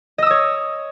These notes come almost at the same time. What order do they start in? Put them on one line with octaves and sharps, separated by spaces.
D#5 E6 D#6 C#5